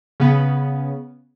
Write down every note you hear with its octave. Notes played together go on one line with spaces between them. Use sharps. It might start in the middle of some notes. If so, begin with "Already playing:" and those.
C#3 B3